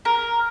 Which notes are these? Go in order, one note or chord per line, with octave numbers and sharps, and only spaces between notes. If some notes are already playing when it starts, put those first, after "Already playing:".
A#4